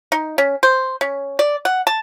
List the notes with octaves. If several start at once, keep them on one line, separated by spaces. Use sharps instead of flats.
D#4
C#4
C5
C#4
D5
F#5
A5